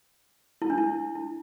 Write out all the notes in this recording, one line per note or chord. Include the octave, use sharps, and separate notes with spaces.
E4
D4
E4
E4